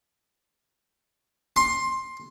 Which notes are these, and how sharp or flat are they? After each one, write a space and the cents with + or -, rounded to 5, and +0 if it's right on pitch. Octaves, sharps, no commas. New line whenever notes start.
C6 +15